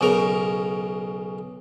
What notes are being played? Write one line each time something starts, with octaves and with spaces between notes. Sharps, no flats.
B1 C#3 A#4